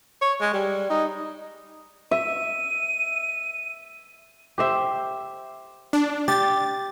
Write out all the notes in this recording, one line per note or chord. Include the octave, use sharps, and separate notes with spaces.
C#5
G#3
G3
D#4
E5 D#7
G4 C5 E5
D4
G4 A6